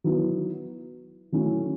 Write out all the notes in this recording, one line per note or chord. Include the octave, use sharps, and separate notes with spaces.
F#3 B3 E4
F#3 A3 C#4 E4